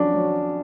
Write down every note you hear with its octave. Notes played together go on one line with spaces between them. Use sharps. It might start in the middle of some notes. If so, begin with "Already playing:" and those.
Already playing: F2 F#3 C#4 D4
F#3